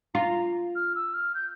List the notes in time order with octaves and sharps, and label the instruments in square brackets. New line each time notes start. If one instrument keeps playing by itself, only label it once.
[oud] F4 [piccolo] A#5
[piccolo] F6
E6
F6
G6